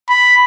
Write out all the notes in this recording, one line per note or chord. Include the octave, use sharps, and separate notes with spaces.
B5